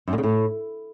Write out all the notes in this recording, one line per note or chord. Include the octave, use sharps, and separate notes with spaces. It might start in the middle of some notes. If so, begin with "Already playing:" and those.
F#2
A#2
C#3
A2